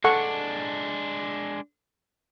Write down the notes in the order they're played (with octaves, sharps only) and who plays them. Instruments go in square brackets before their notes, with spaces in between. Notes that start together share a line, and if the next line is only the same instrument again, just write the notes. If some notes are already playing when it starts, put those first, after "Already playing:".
[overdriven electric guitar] G#3 D4 [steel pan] A4 F#5 C#6